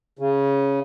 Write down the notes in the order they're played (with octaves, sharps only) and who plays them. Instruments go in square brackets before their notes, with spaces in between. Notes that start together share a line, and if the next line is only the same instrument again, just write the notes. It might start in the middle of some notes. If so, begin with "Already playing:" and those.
[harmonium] C#3